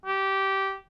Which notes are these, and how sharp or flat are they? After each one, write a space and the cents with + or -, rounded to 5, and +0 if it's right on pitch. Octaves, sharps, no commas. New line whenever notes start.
G4 -15